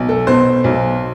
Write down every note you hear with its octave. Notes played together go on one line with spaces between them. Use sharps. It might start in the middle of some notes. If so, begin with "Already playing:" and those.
Already playing: B1
A4
B2 C5
B1